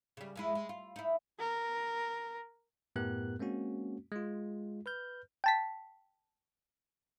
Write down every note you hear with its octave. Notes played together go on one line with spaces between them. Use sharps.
C#3 G3
F2 G#3 E4
G#3
F4
D#4 E4
A#4
F#2 A2 B3 G4 A#4 F#6
G#3 A#3 C4 C#4 F#4
G#3 F4
B4 F6 G6
G5 A5 B6